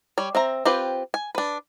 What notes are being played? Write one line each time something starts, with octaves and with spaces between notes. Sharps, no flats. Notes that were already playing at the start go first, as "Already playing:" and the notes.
G3 C#5
C4 E5 A#5
C4 F4 G4 B4
G#5
D4 B4